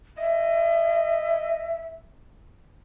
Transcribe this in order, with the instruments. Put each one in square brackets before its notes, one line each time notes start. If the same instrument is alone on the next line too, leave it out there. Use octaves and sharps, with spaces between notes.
[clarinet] D#5 [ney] E5